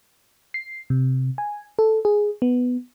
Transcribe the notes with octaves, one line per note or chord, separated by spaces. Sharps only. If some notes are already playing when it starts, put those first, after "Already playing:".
C7
C3
G#5
A4
G#4
B3